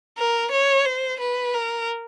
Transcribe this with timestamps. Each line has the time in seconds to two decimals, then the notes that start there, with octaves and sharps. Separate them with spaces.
0.18 A#4
0.52 C#5
0.85 C5
1.20 B4
1.54 A#4